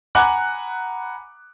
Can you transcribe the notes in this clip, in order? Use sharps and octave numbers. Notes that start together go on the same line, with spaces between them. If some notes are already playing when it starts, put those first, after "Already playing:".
F#5 G#5 A#5 B5 D6 F#6